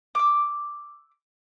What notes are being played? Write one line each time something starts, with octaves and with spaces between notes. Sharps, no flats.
D6 E6